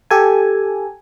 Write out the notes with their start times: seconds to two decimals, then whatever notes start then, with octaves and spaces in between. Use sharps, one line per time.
0.11 G4 A4 G#5